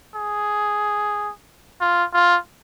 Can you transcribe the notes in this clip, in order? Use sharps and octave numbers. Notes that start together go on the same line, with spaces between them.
G#4
F4
F4